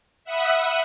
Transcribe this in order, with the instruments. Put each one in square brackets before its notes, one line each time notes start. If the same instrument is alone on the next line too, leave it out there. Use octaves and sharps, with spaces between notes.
[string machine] E5 F#5 B5 D#6 F#6